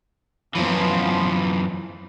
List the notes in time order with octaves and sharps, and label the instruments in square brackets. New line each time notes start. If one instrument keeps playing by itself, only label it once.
[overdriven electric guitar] F#2 E3 [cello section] F3 B3